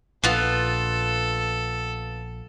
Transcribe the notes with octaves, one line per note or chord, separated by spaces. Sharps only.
A#1 B3 F4 A4